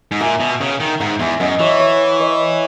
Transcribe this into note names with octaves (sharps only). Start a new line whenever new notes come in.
G#2
A#2 E5 G#5
B2
C#3 F#5 A#5
D#3
G#2 F#5 A#5
E2 E5 G#5
F#2 D#5 F#5
E3 C#5 E5
C#5 E5
B4 D#5